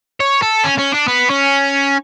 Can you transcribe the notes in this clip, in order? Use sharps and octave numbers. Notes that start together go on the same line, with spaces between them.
C#5
A4
C#4
C#4
D4
B3
C#4